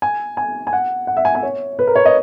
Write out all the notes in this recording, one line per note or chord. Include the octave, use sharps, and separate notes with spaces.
G#5
G#5
G#5
F#5
F#5
E5
G#5
G#5
C#5
B4
A#4
C#5
D#5